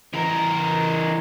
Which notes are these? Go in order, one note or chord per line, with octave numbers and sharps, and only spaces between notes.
E3 A#4